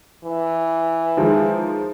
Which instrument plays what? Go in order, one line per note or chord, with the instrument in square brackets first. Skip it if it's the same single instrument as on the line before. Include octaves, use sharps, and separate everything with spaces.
[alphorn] E3
[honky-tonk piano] D#3 F3 G#3